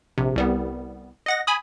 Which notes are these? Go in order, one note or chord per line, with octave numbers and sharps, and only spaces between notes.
A#1 C3
C2 G3 B3
D#5 F#5 A#6
G#5 B5 D#6